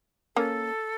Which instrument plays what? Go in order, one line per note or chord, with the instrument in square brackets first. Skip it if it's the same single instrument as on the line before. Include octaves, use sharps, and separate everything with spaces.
[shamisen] A#3 C#4 [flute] A4